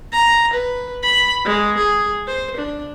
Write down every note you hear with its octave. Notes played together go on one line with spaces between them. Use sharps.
A#5
B4
B5
G#3
G#4
C5
D4